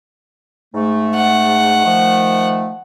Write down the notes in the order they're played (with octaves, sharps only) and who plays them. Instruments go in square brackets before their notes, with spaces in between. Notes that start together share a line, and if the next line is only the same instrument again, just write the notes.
[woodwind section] G#2 A3
[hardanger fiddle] F#5
[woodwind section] D#3 F3 A3